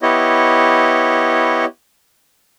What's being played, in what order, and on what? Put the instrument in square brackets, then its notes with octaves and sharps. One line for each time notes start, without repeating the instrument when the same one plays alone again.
[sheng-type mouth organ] B3 E4 G4 C#5 D#5